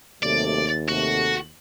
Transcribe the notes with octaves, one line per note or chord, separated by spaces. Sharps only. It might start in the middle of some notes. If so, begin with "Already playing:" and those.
D#2 C3 F#3 A3 D5
C3 A3 F#4